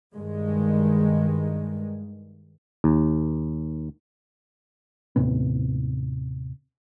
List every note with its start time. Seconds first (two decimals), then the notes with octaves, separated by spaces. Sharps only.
0.14 G2 D#3 G#3
2.84 D#2
5.16 D#2 A2 C3 B3